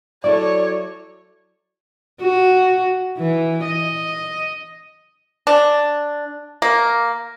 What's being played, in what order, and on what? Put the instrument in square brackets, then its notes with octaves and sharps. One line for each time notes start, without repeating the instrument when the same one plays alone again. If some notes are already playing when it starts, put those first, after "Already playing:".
[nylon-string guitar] F#3 E4 A4 [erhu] C#5 [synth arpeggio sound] D5
[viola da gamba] F#4
E3
D#5
[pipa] D4
A#3